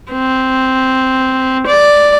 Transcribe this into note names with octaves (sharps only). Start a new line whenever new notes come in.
C4
D5